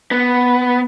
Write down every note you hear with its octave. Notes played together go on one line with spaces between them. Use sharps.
B3